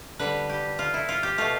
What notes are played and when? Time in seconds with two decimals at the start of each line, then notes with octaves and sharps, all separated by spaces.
0.19 D3 G3 B4
0.50 G4
0.79 F4
0.94 E4
1.09 F4
1.23 G4
1.38 B2 A3 F4